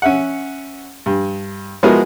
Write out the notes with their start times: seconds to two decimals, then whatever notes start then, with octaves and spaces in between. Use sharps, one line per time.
0.02 C#4 E5 F#5
1.06 G2
1.83 F3 G#3 B3 E4 F#4 A#4